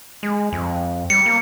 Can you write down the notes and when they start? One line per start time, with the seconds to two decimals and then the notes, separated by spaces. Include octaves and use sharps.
0.23 G#3
0.52 F2
1.10 G3 C#7
1.26 A#3